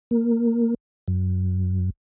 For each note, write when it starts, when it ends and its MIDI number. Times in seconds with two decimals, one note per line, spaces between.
0.11 0.74 58
1.08 1.90 42